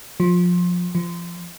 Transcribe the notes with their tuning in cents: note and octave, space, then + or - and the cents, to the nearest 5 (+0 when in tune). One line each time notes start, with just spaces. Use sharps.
F3 +25
F3 -20